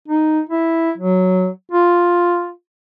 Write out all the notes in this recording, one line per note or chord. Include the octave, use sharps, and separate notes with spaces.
D#4
E4
F#3
F4